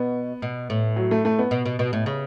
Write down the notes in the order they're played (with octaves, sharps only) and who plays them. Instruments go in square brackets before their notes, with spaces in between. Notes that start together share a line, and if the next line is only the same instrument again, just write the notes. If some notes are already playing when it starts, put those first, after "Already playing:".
Already playing: [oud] B2 [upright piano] B3
[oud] B2
A2
[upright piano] F#3
A3
A3
B3
[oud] B2
B2
B2
A2
C#3